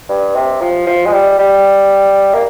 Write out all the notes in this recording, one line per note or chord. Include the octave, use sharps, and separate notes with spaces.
G2
C3
F3
F3
G#3
G3
G3
A#3